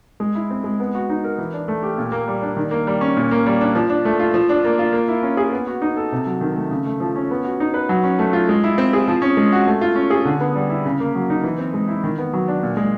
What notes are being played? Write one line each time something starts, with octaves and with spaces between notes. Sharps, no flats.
G#3
E4
C4
G#3
B3
F#4
D#4
A#4
E3
D4
A3
G4
A#2
A#3
G3
D4
D#3
A#3
G3
C#4
A#2
A#3
G3
D4
F3
D4
A3
F4
F3
D4
A#3
F4
A#3
E4
C#4
G#4
B3
F#4
D#4
A4
C3
F#3
D#3
A3
C#3
A3
F3
C#4
B3
F#4
D#4
B4
F#3
C#4
A3
F4
G#3
E4
C4
G#4
F3
C#4
G#3
F#4
A3
F4
C#4
G#4
D3
B3
G3
E4
C#3
A#3
F#3
D#4
E3
C4
G#3
E4
D#3
B3
F#3
D4
A#2
G#3